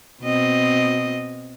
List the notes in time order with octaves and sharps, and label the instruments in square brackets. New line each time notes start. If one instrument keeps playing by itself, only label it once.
[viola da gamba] B2 C4 D#5